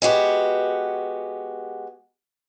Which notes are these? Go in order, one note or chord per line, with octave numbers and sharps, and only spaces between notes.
G#3 B3 F#4 G4